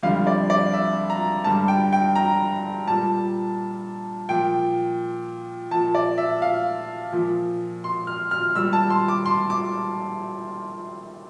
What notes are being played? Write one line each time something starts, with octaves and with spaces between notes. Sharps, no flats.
F2 D3 G3 F5
D5
D5
E5
A#5
G2 D3 G3 A5
G5
G5
A#5
A#2 G3 A5
A#2 F3 G5
A#2 F3 A5
D5
E5
F5
A#2 F3
C6
F6
F6
A#2 G3 E6
A5
C6
D6
C6
D6